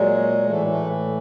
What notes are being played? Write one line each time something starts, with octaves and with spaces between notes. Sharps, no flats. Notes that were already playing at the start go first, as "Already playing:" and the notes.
Already playing: A#2 F#3 G#3
A2 E3 A3
A3